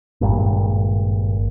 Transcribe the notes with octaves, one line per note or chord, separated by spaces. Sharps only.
G#1 G2 A#2